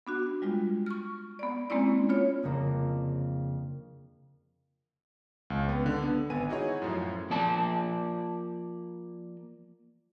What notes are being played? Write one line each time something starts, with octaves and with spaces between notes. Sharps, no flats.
B3 D4 F#4
G3 G#3 F4
C#6 F6
B3 D5
G#3 A#3 C4 C#4 E4 D5
B3 F4 C#5
F2 C#3 A#3 D4
C#2
B3
D3
B3
G#1 B3 G#5 D#7
D#4 E4 F#4 G#4 C#5
F#2 A2 F3
F3 A#3 D5 A5